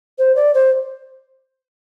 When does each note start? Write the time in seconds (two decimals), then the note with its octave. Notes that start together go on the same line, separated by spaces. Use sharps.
0.19 C5
0.36 D5
0.54 C5